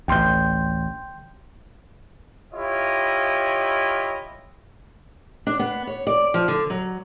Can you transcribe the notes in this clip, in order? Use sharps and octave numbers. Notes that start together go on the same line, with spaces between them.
A1 D2 G5 C6 G6
E4 F4 G4 C#5 D#5
D4
B3
C#5
D5
F3
D3
F#3